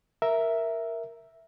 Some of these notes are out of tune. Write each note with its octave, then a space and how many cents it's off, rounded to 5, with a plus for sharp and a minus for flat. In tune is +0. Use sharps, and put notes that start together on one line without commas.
A#4 +0 E5 +0